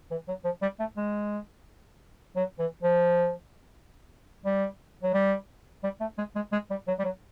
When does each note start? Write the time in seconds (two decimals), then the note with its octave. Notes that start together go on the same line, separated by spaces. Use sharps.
0.11 E3
0.28 F#3
0.44 F3
0.62 G3
0.79 A3
0.97 G#3
2.36 F#3
2.59 E3
2.82 F3
4.45 G3
5.03 F#3
5.13 G3
5.83 G3
6.00 A3
6.18 G#3
6.36 G#3
6.52 G#3
6.70 G3
6.87 F#3
6.99 G3
7.04 F#3